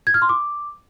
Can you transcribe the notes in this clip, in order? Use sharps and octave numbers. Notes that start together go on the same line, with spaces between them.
G#6
F6
C6
D6